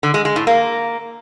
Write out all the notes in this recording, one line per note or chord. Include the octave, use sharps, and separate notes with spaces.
D3
G#3
G#3
A2
A#3